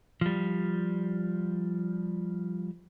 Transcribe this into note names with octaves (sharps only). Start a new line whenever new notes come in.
F3 G3